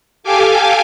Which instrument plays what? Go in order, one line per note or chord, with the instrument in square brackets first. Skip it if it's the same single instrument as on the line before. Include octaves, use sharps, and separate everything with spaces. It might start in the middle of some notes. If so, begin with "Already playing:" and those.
[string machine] G4 A4 F5 G#5 D6